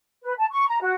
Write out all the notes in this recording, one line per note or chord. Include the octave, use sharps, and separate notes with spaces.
B4
A5
C#6
A#5
F#4